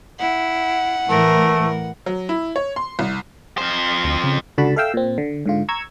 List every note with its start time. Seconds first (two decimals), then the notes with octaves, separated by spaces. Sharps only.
0.19 E4 F#5
1.09 A2 E3 A3 A#4
2.06 F#3
2.29 E4
2.56 C#5
2.76 C6
2.99 C2
3.58 F2 C5
4.04 D2
4.24 C#3
4.58 C#2 D3 F#4 A5 B5
4.76 A4 E5 F5 G5 E6
4.94 A#2 C4
5.18 D3
5.46 G#2 D3 F4
5.69 A#5 C#6 E6 G#6